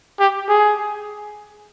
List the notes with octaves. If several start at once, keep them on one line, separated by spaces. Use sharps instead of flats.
G4
G#4